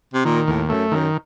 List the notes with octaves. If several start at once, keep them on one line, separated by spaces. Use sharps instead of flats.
C3
A#2 D#3
D#2 A2
F#2 A3
F#2 D#3